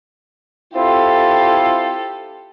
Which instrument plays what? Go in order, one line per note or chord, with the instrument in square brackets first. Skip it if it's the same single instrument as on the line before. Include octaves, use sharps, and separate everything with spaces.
[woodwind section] C4 E4 F4 [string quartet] G4 A4